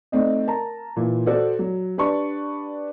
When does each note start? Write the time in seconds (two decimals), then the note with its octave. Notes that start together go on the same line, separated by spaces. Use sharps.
0.12 A3 C4 D#4 D5 D#5
0.47 A#4 A5 A#5
0.96 A#2 E3
1.26 F#4 A4 C5 D5
1.59 F#3
1.98 D4 G4 B4 D5 A5 C#6